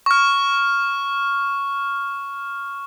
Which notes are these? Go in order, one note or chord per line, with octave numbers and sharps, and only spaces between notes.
C#6 F6